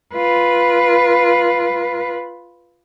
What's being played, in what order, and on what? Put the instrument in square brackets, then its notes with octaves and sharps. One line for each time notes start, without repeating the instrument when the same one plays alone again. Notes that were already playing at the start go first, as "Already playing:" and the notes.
[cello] F4 B4